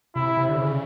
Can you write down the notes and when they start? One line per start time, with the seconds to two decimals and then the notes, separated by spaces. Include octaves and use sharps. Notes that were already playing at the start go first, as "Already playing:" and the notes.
0.15 C3 E4
0.37 C3
0.49 D3
0.58 C#3